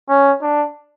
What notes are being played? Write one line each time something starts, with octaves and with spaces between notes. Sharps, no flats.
C#4
D4